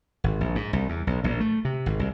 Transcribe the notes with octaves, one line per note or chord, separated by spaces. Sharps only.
G#1
A#1
G#2
C2
E2
B1
A#1
A3
C3
G#1
C2